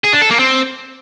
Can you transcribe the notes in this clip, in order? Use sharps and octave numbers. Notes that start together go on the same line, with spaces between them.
G#4
D4
A4
A#3
C4